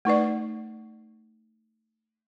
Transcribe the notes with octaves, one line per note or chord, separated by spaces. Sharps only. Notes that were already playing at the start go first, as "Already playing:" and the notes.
A3 D#4 B4 D5